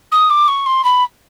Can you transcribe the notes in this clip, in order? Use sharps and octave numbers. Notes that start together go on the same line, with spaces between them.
D#6
D6
C#6
C6
B5